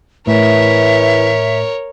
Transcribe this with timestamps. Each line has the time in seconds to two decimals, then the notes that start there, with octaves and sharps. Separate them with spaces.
0.27 A2 E3 A#4 C#5 E5